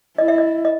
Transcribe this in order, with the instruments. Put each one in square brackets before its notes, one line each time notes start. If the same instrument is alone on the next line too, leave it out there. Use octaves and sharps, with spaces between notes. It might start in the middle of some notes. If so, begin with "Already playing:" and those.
[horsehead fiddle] E4 [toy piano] D#5
[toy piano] E5
D#5
D#5